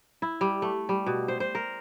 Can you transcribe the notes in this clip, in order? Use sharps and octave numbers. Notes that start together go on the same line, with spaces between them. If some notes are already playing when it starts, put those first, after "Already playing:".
E4
G3
A3
G3
B2
C5
C5
A#4